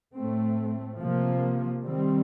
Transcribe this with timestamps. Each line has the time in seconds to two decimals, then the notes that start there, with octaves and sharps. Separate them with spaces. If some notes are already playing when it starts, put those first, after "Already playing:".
0.16 A2 A3 C4
1.00 C3 F3 A#3
1.84 D#3 G3 C4